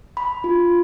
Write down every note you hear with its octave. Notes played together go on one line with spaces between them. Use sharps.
B5
F4